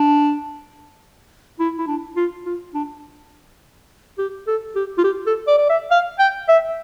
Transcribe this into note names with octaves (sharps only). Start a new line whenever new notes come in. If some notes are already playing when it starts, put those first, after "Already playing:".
Already playing: D4
E4
E4
D4
F4
F4
D4
G4
A4
G4
F4
G4
A4
D5
D5
E5
F5
G5
E5